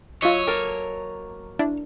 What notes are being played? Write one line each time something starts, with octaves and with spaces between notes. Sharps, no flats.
F#3 F4 C#5 D#5 E5 C#6
A#3 A#4 A5
D4 E4